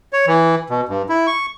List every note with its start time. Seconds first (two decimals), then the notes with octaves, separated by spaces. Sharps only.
0.13 C#5
0.27 E3
0.70 B2
0.89 G2
1.09 E4
1.27 C#6